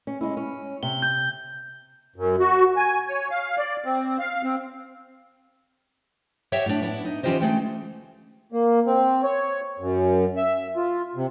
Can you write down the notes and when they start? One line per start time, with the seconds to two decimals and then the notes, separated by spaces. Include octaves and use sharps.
0.07 C#4
0.21 G#3 C#4 E4
0.37 C#4
0.83 C3 G7
1.02 G6
2.16 F#2
2.40 F#4
2.77 G#5
3.08 C#5
3.31 F5
3.58 D5
3.85 C4
4.19 F5
4.43 C4
6.52 G4 C#5 D#5 E5 F#5 G5
6.66 A2 D4
6.81 B3 D4 E4
7.05 D#4
7.23 E3 C#4 F4 G4 C5 D#5
7.40 D3 G#3 A3 G5
8.52 A#3
8.86 C4
9.23 C#5
9.79 F#2
10.36 E5
10.76 F4
11.15 C3